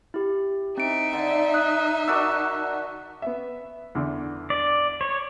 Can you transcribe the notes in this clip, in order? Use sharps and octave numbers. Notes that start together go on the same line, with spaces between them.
E4 G4
C4 D#4 E5 D7
D3
D#6 F#6
D4 F#4 A#4 E6 F#6
B3 E5
E2 D3
D5
C#5